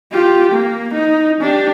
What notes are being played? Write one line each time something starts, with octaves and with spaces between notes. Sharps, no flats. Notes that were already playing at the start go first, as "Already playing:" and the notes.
F4 G4
A#3
D#4
D4 G4